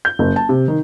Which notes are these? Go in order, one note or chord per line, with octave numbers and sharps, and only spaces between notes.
G6
F#1
A5
C3
D#3